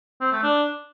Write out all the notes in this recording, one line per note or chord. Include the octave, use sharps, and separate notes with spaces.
C4
A3
D4